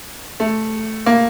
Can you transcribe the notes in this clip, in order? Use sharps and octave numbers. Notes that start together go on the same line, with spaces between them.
A3
A#3